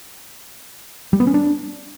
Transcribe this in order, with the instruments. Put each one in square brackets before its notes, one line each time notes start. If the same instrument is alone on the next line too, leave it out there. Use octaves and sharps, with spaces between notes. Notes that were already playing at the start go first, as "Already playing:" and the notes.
[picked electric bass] G3
B3
C#4
D4